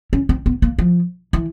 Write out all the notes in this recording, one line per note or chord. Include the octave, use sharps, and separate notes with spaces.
C#4
C4
B3
A#3
F3
E3